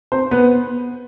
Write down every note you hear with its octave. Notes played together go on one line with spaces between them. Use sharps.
C4 C5
B3 B4